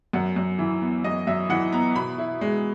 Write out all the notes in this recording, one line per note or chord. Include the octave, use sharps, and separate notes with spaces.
F#2 F#5
F#2
E3
B3
F#2 D#5
F#2 E5
E3 F#5
B3 A#5
B2 B5
E4
G#3